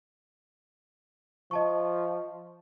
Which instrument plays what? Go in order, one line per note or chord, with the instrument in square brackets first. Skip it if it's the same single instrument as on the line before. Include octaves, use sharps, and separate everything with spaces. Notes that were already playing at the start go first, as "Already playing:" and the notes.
[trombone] F3 [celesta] D#5 A5 C#6